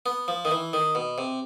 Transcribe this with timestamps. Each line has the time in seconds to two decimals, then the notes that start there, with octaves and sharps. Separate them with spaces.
0.06 B3
0.28 F3
0.45 D#3
0.51 E3
0.73 D#3
0.95 B2
1.18 C3